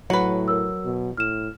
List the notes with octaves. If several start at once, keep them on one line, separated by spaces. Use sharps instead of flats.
A2 F#3 B4 F#5
A#4 E6
B2
A2 F6 E7